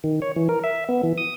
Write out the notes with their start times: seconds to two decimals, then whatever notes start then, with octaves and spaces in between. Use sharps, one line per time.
0.04 D#3
0.22 C#5
0.36 E3
0.49 A#4
0.64 E5
0.89 B3
1.03 E3
1.18 D#6